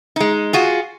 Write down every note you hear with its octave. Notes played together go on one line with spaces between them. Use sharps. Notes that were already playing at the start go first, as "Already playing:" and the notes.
G#3 D#4
F4 F#4 G#4